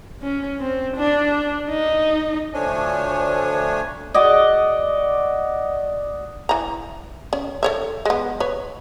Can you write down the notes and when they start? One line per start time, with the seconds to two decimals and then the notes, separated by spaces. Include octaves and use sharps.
0.22 C#4
0.60 C4
0.97 D4
1.69 D#4
2.54 D2 F3 A3 D4 C#5 G#5
4.14 F#4 D5 D#5
6.49 E3 A#5
7.33 C#4
7.63 A4 C#5 E5
8.05 G#3 B3
8.40 B4 C#5